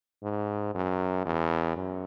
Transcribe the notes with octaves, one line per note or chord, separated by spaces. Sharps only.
G#2
F#2
E2
F#2